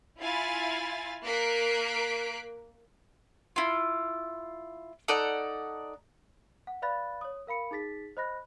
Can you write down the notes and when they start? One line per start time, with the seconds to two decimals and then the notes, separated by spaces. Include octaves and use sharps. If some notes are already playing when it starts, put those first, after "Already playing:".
0.19 E4 F4 F5 G#5 B5 A6
1.24 A#3 A#4 F#6 B6 C7 D7
3.56 E4 F4
5.08 D#4 A4 D5 F#5
6.67 F#5
6.82 B4 D5 F5 B5 F#6 A6
7.21 C#5 D#6
7.47 A#4 F5 B5 C#7
7.71 D#4 G#4 A6 B6
8.17 C5 D#5 B5 F#6 A#6